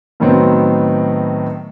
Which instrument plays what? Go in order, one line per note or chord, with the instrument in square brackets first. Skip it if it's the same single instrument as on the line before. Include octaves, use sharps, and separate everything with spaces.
[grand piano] A2 D#3 F#3 B3 C4